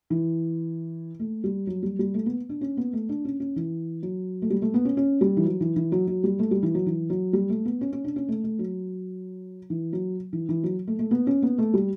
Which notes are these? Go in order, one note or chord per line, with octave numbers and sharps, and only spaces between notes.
E3
A3
G3
F#3
G3
G3
A3
B3
D4
C#4
B3
A3
D4
C#4
C#4
E3
F#3
A3
G3
A3
B3
C#4
C#4
G3
E3
F#3
E3
E3
F#3
F#3
G3
A3
G3
E3
F#3
E3
F#3
G3
A3
B3
C#4
C#4
D4
C#4
A3
A3
F#3
E3
F#3
E3
E3
F#3
A3
A3
B3
C#4
B3
A3
G3